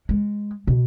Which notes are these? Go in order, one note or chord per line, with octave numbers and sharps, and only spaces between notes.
G#3
B2